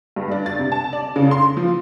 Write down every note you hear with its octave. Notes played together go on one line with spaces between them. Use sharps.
G2
D4
A6
C3
A5
D5
C#3
C6
F3